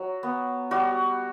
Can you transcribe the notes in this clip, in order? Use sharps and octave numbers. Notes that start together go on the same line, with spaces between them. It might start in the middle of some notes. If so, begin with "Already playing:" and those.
Already playing: F#3
B3
G3 F#4